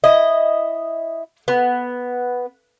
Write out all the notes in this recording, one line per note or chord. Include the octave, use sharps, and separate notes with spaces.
E4 D#5
B3